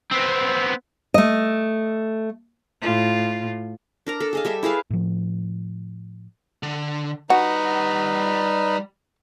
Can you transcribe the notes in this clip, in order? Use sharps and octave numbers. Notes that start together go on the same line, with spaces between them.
B3 C4
A3 D#5
A2 F4
D4 A#4 A#5
A4
G#4 D#5 F5
G3 A4 E5
E4 G#4 B4 F5
A2 F3
D3
G3 D#4 F#4 B4 F#5